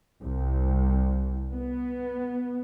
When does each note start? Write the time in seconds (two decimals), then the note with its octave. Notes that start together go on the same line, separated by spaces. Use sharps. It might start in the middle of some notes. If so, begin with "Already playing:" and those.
0.24 C2
1.54 B3